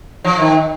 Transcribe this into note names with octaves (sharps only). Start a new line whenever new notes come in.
F3
D#3